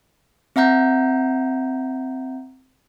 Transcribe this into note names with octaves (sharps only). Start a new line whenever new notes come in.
C4 E5 F#5 A#5 G6